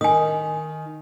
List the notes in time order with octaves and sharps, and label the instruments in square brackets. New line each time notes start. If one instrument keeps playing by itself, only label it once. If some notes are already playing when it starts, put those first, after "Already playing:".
[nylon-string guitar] D#3 [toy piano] G#5 D#6